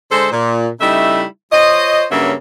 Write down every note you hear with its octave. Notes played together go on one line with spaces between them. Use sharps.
D3 G#3 A4 C5
A#2
C#3 G3 A3 D#4 E4 E5
F4 C5 C#5 D#5
G2 C#3 F#3 A#3 C#4 E5